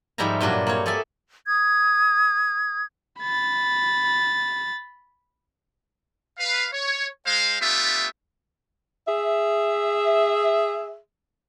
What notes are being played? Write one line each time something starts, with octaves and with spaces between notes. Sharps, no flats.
G#2 F3 G3 E5 G#5 A#5
G2 A#2 F#3 D4 F#4
A#3 C4 C#5
G#4 A4 D5 E5 G#5
D#6 G#6
B5 A6
B4 F5
C#5
G#3 C5 F5
A3 B3 D4 F4 G4 E5
G#4 E5